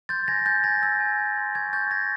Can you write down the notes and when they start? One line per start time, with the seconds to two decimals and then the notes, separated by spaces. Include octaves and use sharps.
0.09 C6 G6 A6
0.28 G#5 G#6 A#6
0.45 G#5 G6 A6
0.64 G#5 G#6 A#6
0.83 E6 G#6
1.00 G#5
1.19 C6
1.38 C6
1.55 C#6 G#6
1.73 C#6 G6 A6
1.91 G#5 G#6 A#6